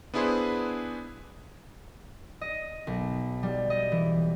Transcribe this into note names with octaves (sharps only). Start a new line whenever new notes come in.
B3 D4 E4 G#4 B4 C5
D#5
B1
G3
D#5
E3